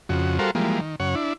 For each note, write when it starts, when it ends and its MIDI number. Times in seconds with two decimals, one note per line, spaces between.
0.09 0.39 41
0.09 0.39 49
0.09 0.39 66
0.39 0.51 55
0.39 0.51 66
0.39 0.51 69
0.39 0.51 70
0.39 0.51 72
0.39 0.51 77
0.55 0.80 52
0.55 0.80 53
0.55 0.80 55
0.55 0.80 56
0.55 0.80 58
0.81 0.96 51
1.00 1.15 42
1.00 1.15 49
1.00 1.15 73
1.00 1.15 78
1.15 1.33 62
1.15 1.33 64